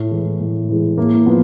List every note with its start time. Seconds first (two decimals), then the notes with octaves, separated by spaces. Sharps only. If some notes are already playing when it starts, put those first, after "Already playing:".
Already playing: A2
0.11 E3 G#3
0.40 A2
0.69 E3 G#3
0.97 A2 A#3
1.26 F3 B3